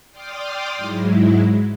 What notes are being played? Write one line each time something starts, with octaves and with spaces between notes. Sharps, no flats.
D5 G5 C6 D6 D#6 F6
G#2 F#3 G#3 E4